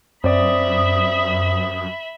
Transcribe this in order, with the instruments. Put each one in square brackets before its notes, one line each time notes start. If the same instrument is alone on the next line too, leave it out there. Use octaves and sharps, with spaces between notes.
[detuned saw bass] F#2 [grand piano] C4 D5 [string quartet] E5 B5 [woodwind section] D#6